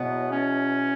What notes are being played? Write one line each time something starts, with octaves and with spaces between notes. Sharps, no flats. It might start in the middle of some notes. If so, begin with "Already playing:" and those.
Already playing: E2 B2 F#3 B3
C#4